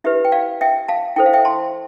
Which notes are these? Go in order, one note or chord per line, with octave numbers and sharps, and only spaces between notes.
E4 G4 B4 E5
G5
D5 F5
E5 G5
F5 A5
E4 A4 C5 G5
F5
E5 G5
A5 C6